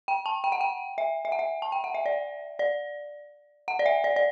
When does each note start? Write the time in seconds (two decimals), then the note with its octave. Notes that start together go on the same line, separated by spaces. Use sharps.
0.08 G5
0.26 A5
0.44 G5
0.52 F#5
0.61 G5
0.98 E5
1.25 E5
1.32 F#5
1.39 E5
1.62 A5
1.72 G5
1.84 F#5
1.94 E5
2.06 D5
2.59 D5
3.68 F#5
3.79 D5
3.86 E5
4.04 D5
4.16 D5